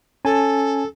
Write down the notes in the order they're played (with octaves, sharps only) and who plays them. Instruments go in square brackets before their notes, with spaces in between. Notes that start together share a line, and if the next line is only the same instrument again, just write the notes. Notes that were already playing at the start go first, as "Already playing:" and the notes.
[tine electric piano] C#4 G#5 A5 [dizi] A4